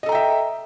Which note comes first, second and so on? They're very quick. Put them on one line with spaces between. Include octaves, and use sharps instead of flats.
D#5 A4 A#5 G5 E5